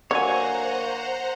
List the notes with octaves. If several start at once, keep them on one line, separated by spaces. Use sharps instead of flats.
D3 F#3 A#3 C5 C#5 F#5 G#5 A#5